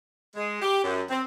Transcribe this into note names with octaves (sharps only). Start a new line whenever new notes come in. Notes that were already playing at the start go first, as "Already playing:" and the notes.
G#3
G4
F#2
C4